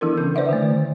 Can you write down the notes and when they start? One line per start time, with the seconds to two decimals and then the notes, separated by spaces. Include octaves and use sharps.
0.01 E3 B3 D4 E4 A4 A#4
0.17 C#3 C#4 G6
0.35 B4 C5 D5 E5 F#5
0.49 D3 D#3 A3